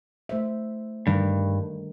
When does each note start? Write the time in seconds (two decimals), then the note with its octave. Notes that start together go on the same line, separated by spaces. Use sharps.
0.29 A3 C5 E5
1.07 G2 D3 D#3 G3